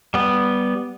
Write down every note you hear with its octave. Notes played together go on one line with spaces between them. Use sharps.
G3 B3